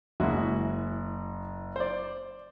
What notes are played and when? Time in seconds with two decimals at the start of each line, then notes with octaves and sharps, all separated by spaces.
0.20 F#1 G#3 E4 F#4
1.76 C5 D5